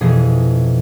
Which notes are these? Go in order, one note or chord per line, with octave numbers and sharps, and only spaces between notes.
F1 B2 E3 G#4